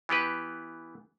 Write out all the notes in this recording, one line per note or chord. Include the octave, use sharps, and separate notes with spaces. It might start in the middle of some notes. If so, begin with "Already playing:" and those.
E3 B3 G4 B4